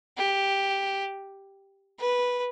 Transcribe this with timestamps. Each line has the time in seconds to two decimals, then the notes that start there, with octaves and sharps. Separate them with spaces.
0.17 G4
1.99 B4